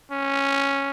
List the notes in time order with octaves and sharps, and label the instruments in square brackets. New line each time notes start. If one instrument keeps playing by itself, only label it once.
[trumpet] C#4